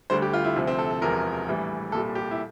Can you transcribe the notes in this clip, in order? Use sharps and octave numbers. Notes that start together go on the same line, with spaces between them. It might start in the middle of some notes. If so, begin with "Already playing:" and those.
D2 D3 G3 C5
G4
F4
E4
D2 C3 F3
C4
A4
A4
E1 E2 C3 F3 A#4
A#1 A2 E3 G3
C2 A#2 G3 A4
G4
E4